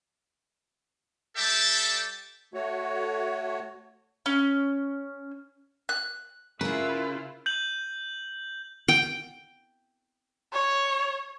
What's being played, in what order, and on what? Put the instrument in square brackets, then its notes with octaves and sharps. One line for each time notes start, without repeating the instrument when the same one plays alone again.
[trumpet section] G3 A4 D5 E5 G5 A5
[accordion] A3 F#4 C#5
[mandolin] C#4
F#6
[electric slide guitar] C#3 [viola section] E4 F4 [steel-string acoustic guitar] G#4 A#4 [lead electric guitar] B4
[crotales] G6 F#7
[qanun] G5
[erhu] C#5